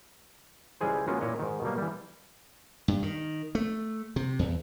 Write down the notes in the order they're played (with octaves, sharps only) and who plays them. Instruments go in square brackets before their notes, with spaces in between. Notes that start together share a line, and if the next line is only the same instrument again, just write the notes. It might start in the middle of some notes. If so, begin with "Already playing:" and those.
[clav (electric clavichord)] C#2 G3 G#3 E4 G#4 C5
G#3 A#3 B3 C#4 F4 F#4
A#2 E4 C#5 D#5
G#2 D#3
B2 F#3 G3 A#3
E3 G3
[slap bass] G2
D#3
A3
C3
E2